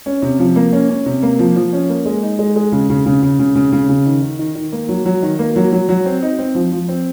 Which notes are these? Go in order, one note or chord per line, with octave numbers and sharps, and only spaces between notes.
C#4
C3
F3
A#3
C#4
C#4
C3
A#3
F3
F3
C#4
A#3
G#3
D#4
G#3
G#3
C#3
C#3
C#3
C#3
C#3
C#3
C#3
C#3
D#3
D#3
D#3
D#3
A#3
F#3
F#3
D#3
A#3
F#3
F#3
F#3
C4
D#4
C4
F3
F3
C4